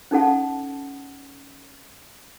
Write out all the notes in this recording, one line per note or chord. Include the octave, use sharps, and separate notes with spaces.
C#4 D#4 A4 F#5 A5